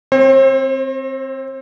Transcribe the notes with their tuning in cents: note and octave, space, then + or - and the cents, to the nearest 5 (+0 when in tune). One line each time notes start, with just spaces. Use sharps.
C4 +5 C5 +40